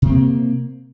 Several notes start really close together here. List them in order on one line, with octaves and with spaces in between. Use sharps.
C3 C4 A#3